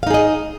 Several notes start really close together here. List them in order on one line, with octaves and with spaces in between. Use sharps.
F5 D#4 G#4 D#5